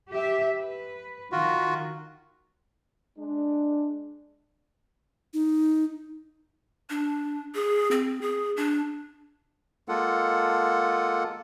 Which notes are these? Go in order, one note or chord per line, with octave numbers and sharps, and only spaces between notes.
G4 E5
B4
D#3 F4 F#4
G#3 D4
D#4
D4
G#4
C4
G#4
D4
G#3 A#3 F4 A4 F#5